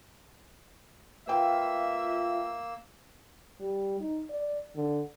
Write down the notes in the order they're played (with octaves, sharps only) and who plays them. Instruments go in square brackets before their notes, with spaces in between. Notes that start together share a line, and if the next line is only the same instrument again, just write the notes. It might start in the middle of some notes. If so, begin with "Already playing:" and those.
[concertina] A#3 E6 [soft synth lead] F4 [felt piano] B4 G5 [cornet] E5
[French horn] G3
D#4
D5
D3